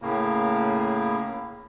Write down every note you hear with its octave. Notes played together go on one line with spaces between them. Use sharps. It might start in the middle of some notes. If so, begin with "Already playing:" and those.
A2 C#3 A#3